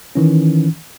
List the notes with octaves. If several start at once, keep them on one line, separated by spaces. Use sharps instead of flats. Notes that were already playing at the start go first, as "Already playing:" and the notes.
D#3 E3 C#4